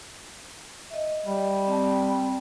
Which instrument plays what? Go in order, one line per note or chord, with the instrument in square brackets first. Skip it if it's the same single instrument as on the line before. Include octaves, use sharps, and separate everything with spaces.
[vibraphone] D#5 E5
[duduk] G3
[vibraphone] C4 G5 A5